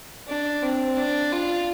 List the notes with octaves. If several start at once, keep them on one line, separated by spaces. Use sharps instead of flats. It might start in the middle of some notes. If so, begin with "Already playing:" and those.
D4
C4
D4
F4